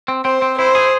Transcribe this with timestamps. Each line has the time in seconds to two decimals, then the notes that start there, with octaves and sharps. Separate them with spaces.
0.08 C4
0.25 C4 C5
0.42 C4
0.59 E4 C5
0.75 G#4